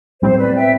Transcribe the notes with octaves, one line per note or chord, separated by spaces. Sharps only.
B1 A2 G3 C4 C5
B4 D5
E5 G5